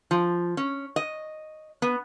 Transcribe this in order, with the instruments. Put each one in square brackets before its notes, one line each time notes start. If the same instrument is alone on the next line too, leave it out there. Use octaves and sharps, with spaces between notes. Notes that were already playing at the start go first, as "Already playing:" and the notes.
[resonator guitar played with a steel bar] F3
C#4
D#5
B3